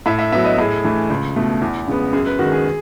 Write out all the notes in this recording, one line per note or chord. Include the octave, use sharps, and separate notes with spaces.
A2 E5
E5
F#3 B3 E5
D#5
A2 G#4
E3 A3
C#2
B2 A3
E2
C#3 G#3 B3
F#2 G#4
B4
D#3 G#3 F#4
G#4